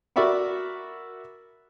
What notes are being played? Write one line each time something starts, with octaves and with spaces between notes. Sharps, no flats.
F#4 A#4 D5 E5 B5 C#6